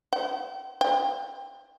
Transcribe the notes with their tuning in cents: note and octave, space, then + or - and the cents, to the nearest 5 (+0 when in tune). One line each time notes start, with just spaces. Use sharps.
G5 -35
G5 +30